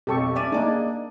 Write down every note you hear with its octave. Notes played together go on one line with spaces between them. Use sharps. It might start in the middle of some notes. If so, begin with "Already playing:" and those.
B1 F2 G4 A4 C#6
C#4 D5 E5 D#7
A#3 D4 D#4 G#4 D5 D#5